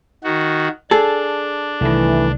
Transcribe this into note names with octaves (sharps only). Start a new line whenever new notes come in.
D#3 F#4
D4 G#4 A4
C2 D#3 E3 A3